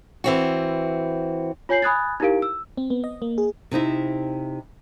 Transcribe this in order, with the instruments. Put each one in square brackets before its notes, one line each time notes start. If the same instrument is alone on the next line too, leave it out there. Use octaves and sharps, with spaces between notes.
[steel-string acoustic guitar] E3 C4 F#4
[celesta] F4 C#5 G#5 G6 C7 F#7
G#5 B5 D#6 F#6 G#6 A6
D#4 E4 G4 A#4 F5 D7
E6
[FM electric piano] C4
B3
D#5
A#3
G#4
[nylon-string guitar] C3 C4 D#4 E4